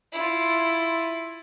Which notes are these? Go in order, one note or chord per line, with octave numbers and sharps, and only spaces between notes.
E4 F4